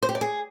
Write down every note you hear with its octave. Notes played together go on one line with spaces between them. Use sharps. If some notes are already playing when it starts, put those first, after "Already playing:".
C5
G4
D5
G#4